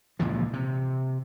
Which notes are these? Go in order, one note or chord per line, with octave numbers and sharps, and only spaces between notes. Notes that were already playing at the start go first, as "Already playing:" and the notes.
C#2 A#2 E3 F3
C3